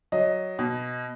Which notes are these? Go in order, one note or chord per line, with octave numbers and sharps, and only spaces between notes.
F#3 D#5
B2